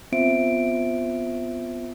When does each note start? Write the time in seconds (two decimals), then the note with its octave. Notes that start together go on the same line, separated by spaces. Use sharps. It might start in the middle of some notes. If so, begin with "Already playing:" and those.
0.12 B3 C4 F4 C5 E5 D7